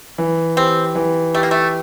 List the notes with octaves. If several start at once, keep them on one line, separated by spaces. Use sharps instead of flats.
E3
C4 G4
E3
A3 G4
A#3
A3